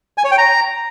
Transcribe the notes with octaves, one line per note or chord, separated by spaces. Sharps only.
G#5
C#5
G5
A#5